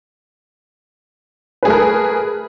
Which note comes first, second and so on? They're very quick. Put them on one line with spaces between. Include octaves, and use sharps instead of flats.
B4 G#4 A3 A#4